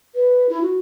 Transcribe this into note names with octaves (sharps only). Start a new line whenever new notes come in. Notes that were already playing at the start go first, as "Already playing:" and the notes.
B4
E4
F#4